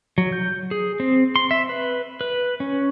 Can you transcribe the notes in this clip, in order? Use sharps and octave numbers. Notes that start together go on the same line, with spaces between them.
F#3
G6
G#4
C4
C6
E5
B4
B4
C#4